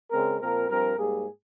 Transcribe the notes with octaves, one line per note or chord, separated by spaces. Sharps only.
C#3 G#3 C4 A#4
A#2 F3 C4 A#4
G2 F3 C4 A#4
G#2 G3 A#3 G#4